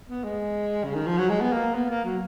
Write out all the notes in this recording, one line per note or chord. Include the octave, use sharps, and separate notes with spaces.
B3
G#3
C#3
D#3
F3
F#3
G#3
B3
A#3
B3
A#3
F#3